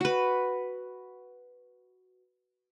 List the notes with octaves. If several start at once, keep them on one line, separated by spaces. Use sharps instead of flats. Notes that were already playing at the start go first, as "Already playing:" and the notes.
F#4 B4